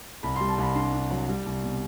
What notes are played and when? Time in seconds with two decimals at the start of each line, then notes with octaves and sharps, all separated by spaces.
0.23 C2 B5
0.36 G3 C6
0.49 A5
0.58 C2 B5
0.75 D4 C6
0.93 D4
1.11 F#3
1.28 G3
1.46 C2
1.64 B2